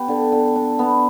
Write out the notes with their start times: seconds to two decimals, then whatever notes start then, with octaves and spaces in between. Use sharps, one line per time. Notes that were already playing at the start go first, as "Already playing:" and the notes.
Already playing: B3 G4
0.08 D3
0.32 D3
0.56 D4
0.79 B3